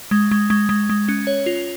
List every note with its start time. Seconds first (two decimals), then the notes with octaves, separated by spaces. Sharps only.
0.11 G#3
0.31 G#3
0.50 G#3
0.69 G#3
0.90 G#3
1.08 C#4
1.27 C#5
1.46 F4